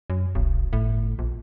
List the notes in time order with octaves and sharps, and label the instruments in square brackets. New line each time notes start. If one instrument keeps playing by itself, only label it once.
[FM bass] F#2
[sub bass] D1 [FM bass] B1
[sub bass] G1 [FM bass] A2
[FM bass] A#1